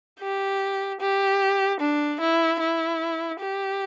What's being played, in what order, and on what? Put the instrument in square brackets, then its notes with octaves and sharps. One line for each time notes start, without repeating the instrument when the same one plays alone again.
[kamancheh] G4
G4
D4
E4
E4
G4